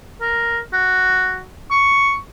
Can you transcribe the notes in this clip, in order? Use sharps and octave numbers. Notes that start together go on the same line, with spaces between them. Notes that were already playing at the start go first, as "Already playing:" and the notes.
A#4
F#4
C#6